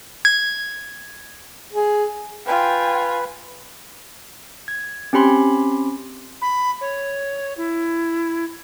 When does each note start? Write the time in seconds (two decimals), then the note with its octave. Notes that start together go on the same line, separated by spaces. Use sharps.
0.25 G#6
1.73 G#4
2.47 F4 B4 G5 G#5
4.68 G#6
5.13 C4 C#4 G4 B5 C6
6.42 B5
6.81 C#5
7.57 E4